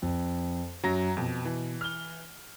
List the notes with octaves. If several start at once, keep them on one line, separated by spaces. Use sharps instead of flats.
F2
F#2 F#3 A#5 A#6
F2 B2
E3
F6 G7